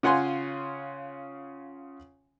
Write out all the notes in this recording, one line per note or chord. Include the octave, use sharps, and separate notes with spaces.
C#3 F4 F#5 G#5 C6